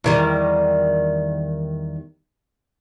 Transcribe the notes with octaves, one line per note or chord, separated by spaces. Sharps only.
E2 D#3 G3